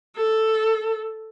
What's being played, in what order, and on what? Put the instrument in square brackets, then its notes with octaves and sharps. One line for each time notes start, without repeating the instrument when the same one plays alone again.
[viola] A4